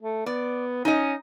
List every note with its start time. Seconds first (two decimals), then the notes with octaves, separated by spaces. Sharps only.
0.02 A3
0.26 B3 D5
0.85 C#4 D#4 D#5